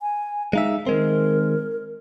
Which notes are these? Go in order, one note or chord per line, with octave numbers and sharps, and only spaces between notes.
G#5
G#3 D#4 E5 F5
D#3 G#3 C4 A#4